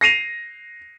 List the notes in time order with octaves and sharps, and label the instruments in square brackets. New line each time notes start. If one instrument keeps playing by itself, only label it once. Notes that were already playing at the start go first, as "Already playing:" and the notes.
[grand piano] A#6 C7 D#7 F7